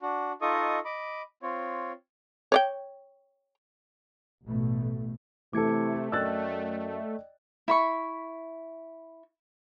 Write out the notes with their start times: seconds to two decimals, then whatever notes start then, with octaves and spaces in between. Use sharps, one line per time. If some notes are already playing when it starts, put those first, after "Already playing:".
0.01 D4 F#4
0.42 D#4 F4 A4 D#5 C#6 D#6
0.85 D#5 B5 D6
1.43 C4 F4 C#5
2.52 C#5 D5 G5
4.44 A1 B2 A3
5.53 C3 E3 A3 A4 D6 G#6 C#7
6.12 F#2 D5 D#5 G5 E6 F#6 A6
7.68 E4 B5 C#6